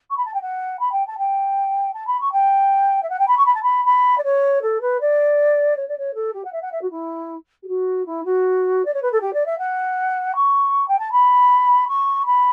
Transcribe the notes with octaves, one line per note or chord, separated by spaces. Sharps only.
C#6
B5
A5
G5
F#5
B5
G5
A5
G5
A5
B5
C#6
G5
E5
F#5
G5
B5
C#6
B5
A5
B5
B5
D5
C#5
A4
B4
D5
C#5
D5
C#5
A4
G4
F#5
E5
F#5
E5
F#4
E4
G4
F#4
E4
F#4
D5
C#5
B4
A4
G4
D5
E5
F#5
C#6
G5
A5
B5
C#6
B5